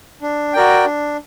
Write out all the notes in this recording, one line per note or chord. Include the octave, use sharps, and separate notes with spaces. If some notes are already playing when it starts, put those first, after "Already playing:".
D4
F#4 A#4 D5 G5
D4